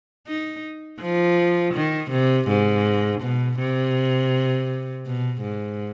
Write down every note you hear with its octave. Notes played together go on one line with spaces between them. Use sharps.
D#4
F3
D#3
C3
G#2
B2
C3
B2
G#2